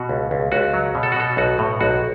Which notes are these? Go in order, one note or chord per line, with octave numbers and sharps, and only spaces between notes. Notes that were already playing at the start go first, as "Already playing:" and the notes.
Already playing: B2 F#4
C#2
C#2
C#2 F#4
F#3
B2
A4
F#4
B2 A4
B1 F#4
A2
B1 F#4